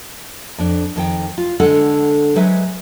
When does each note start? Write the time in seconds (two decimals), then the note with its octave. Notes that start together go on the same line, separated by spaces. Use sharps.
0.58 F2 D4
0.96 F2 D#3 G5
1.38 F4
1.60 D3 G#3 D4 A4 F#5
2.36 F#3 G#3 B4 C5 E5